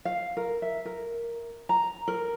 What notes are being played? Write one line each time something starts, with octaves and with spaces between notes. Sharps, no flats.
F5
A#4
E5
A#4
A#5
A#4